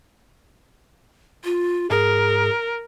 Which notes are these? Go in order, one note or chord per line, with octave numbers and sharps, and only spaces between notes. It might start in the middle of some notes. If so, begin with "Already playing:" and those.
F4
G#2 G#4 A#4